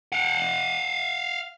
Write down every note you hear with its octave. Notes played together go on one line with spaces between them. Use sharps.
F5 F#5